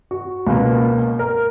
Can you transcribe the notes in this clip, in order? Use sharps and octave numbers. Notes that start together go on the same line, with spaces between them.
F#4
C#2 B2 A#3
A#4